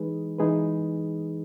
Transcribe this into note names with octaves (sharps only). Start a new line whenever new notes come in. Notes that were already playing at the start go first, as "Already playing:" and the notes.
Already playing: E3 G#3 D#4 G#4 B4
E3 G#3 D#4 G#4 B4